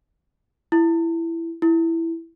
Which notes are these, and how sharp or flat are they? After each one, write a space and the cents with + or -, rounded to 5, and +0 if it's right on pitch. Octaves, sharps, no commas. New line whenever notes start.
E4 +15
E4 +5